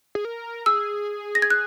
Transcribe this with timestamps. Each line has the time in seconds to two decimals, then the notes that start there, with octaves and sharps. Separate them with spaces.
0.15 G#4
0.25 A#4
0.66 G#4 E6
1.35 A#6
1.42 G#6
1.50 F#6